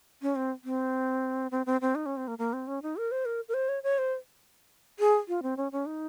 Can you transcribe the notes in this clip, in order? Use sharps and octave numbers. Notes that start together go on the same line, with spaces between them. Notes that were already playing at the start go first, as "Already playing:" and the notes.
C#4
C4
C4
C4
C4
C4
D#4
C#4
C4
A#3
A#3
C4
C#4
D#4
A#4
C5
A#4
A#4
C5
C#5
C#5
C5
G#4
F4
C4
C#4
C#4
D#4